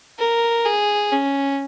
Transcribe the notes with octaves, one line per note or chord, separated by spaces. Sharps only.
A#4
G#4
C#4